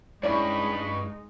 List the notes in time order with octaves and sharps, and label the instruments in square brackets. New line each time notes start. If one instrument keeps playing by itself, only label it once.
[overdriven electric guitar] G2 [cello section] G#3 D#4 [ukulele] C#4 E4 D5 [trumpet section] B5 C#6